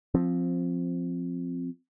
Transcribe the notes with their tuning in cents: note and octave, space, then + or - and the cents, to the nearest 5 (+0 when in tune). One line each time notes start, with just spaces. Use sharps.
F3 +5 C4 +0